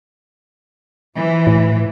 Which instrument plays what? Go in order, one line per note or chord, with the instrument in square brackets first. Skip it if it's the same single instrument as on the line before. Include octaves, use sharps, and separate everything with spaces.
[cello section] E3 F3
[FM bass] A2